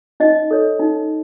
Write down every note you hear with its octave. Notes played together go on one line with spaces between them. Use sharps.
D#4 D#5
A4 C#5
D#4